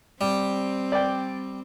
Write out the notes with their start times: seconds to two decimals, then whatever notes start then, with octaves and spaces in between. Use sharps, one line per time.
0.21 G3 C4
0.92 D5 G5